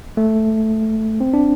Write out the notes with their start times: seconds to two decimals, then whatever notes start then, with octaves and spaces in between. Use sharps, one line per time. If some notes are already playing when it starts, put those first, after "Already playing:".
0.17 A3
1.20 C4
1.34 D4